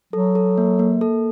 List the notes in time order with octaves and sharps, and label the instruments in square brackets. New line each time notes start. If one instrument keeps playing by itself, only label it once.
[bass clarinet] F#3 [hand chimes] A4
[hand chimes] A4
A#3
A#3
A4